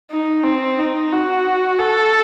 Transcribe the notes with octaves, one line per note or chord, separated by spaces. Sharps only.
D#4
C4
D#4
F#4
A4